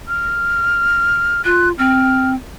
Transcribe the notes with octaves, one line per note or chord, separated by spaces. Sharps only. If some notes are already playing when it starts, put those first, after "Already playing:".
F6
F4 F#6
C4 F6